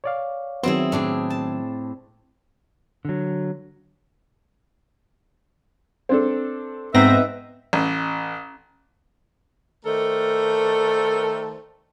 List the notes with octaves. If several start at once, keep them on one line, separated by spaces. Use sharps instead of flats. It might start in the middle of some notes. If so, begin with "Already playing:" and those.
C#5 D5 F5
D#3 F#3 B3 C4 E4 G#4
A2 D4 G#4
A5
D3 F#3
C4 D4 A4
G#2 B3 C4 D#4 B4 E5 A#6
A1
D#3 A3 A4 A#4 C5 D5